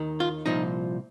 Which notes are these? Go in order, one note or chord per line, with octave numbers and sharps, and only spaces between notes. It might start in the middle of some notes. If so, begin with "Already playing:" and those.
Already playing: D#2 D#3
F4
C2 A#2 F3 D#4